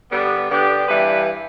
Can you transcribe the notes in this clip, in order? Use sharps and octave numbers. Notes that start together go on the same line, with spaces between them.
D3 G3 B3
D3 B3 D4 G4
G2 E3 G3 D4 B4